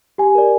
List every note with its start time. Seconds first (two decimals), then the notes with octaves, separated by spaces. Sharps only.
0.18 G4 G#5
0.35 A#4 D5